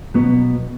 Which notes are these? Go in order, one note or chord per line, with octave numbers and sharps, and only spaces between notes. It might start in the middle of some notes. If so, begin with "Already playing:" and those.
B2 F#3 B3